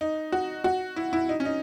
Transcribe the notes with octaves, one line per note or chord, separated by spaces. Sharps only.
D#4
F#4
F#4
E4
E4
D#4
C#4
D#4